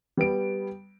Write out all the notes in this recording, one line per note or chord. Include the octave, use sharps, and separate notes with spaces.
G3 B3 D7